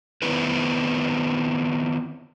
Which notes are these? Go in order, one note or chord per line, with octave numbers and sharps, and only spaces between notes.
D#3 B3 C4 E4 B4